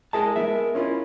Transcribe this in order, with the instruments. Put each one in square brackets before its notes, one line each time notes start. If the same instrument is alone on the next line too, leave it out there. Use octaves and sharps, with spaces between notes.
[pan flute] G#3 [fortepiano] E4 G#4 [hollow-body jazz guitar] A#4 A5
[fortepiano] G#3 B3 [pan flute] A#4 [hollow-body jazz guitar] E5
[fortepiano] C#4 F4 A#4 [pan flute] E4